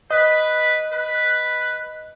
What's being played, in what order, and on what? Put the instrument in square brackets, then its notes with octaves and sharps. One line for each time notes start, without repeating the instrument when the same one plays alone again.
[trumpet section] B4 [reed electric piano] D#5
[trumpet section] B4